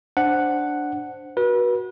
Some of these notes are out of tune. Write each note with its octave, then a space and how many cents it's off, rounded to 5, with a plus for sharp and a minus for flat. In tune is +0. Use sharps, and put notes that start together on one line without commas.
D4 +0 C5 +0 F#5 +0
F#4 +5 B4 -35